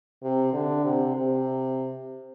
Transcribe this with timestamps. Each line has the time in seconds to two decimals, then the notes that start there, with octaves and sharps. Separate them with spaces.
0.23 C3
0.53 D3
0.85 C3
1.15 C3